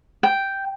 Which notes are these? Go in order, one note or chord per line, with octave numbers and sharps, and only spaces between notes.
G5